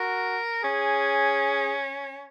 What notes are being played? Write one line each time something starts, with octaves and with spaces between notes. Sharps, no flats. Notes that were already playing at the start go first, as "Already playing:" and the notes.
Already playing: F#4 A#4
C#4 G#4